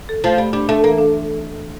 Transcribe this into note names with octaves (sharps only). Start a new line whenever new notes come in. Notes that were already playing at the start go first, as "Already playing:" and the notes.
A4
F3 A3
G3 A3
G3 D4
A3 D4
E3 A#3
D4